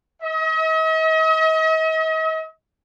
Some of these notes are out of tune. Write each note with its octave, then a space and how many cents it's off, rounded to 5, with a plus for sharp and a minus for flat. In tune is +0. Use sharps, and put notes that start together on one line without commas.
D#5 +45